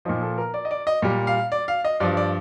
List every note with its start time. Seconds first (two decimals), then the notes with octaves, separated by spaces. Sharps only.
0.05 A#2 F3 D#4
0.22 A4
0.38 A#4
0.54 D5
0.65 D#5
0.71 D5
0.87 D#5
1.02 A#2 G3
1.27 F5
1.52 D5
1.68 F5
1.84 D#5
2.00 G2 F3 D5
2.17 D5